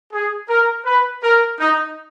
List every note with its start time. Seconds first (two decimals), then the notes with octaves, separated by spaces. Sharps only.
0.13 G#4
0.49 A#4
0.86 B4
1.23 A#4
1.59 D#4